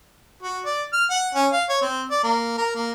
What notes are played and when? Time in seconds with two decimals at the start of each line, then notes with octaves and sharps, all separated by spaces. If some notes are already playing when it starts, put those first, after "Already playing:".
0.42 F#4
0.66 D5
0.93 F6
1.10 F#5
1.35 C#4
1.53 F5
1.70 C#5
1.82 C4
2.11 D5
2.23 A#3
2.58 A#4
2.75 A#3